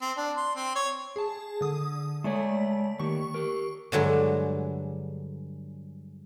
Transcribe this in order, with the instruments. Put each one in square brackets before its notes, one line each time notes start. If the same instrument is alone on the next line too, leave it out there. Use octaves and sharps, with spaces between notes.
[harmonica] C4
D4
C6
C4
C#5
[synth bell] G#4 A5
D3 D#6
[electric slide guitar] G#3 C#5 [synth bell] A3 D5
[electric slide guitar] D#3 A#3 G4 [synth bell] C#6
[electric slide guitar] G4 A#4
[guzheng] G2 D3 F#3 G#3